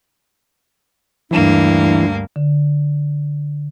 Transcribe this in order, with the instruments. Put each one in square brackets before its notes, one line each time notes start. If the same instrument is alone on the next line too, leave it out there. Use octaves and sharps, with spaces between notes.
[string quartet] D2 G2 A#3 [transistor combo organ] E3 [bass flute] D4
[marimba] D3